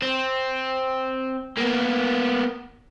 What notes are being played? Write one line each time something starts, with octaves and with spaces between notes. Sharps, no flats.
C4
A#3 B3